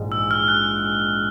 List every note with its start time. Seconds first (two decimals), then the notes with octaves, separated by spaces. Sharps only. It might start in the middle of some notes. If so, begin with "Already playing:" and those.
Already playing: A#1 G#2 E3 G#3
0.12 E6
0.31 F6
0.48 F#6